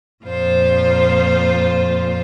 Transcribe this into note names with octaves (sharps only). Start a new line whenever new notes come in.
F2 A#2 F4 C5